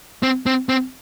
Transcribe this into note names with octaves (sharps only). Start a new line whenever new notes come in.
C4
C4
C4